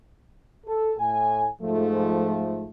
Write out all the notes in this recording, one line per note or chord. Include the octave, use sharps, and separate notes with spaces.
A4
A2 G#5
G#2 F3 A3